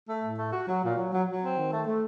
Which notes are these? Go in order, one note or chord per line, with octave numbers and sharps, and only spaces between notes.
A3
A2
A3
F#4
F#3
A#2
F#3
F#3
F#3
C4
D#3
A3
A3